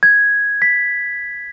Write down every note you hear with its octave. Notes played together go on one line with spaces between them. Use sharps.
G#6
B6